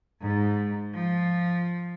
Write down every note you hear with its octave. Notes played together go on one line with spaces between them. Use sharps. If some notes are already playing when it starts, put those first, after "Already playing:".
G#2
F3